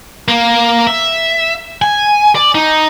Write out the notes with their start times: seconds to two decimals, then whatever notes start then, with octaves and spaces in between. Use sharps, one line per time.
0.28 A#3
0.87 E5
1.82 G#5
2.35 D5
2.55 D#4